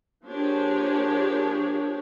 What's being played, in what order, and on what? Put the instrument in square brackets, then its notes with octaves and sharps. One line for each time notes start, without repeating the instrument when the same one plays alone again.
[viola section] F3 A#3 D4 G4 G#4 C#5